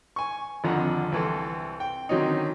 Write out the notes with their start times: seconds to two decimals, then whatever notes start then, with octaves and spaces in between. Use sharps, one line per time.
0.16 G#5 C#6
0.64 G#1 F2 D3 F3 F#5 A#5
1.12 C2 E3 C4 A4
1.80 G5
2.09 D3 D#3 F#3 C4 C#4 D#4